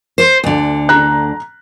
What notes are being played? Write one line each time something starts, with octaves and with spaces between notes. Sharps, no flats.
C5
D2 D3
A#5 F#6